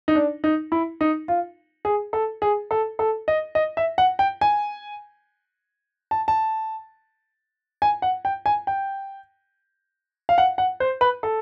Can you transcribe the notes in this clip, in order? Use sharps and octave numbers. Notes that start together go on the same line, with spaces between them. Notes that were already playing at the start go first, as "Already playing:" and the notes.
D#4
D4
D#4
E4
D#4
F4
G#4
A4
G#4
A4
A4
D#5
D#5
E5
F#5
G5
G#5
A5
A5
G#5
F#5
G5
G#5
G5
F5
F#5
F#5
C5
B4
A4